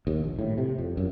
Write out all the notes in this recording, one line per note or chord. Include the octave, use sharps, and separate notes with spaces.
D#2
A#1
A2
C3
F2
F#2